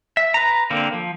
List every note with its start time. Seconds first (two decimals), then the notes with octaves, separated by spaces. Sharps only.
0.17 E5
0.34 B4 A#5
0.70 D3 A#3 C4
0.93 F3